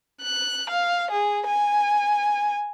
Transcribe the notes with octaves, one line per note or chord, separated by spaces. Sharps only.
F#6
F5
G#4
G#5